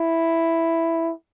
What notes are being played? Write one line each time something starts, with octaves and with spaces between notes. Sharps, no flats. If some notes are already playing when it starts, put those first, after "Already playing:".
Already playing: E4